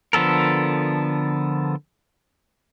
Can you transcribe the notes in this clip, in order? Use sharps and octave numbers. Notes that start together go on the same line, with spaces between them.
D3 F3 B3 A4 A#4